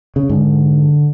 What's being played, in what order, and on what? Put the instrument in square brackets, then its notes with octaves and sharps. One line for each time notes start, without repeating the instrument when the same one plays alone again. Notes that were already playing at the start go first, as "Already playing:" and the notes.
[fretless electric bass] C#3
[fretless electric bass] G#2 [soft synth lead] D3